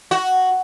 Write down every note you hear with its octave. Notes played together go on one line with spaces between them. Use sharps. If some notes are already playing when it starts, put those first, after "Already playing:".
F#4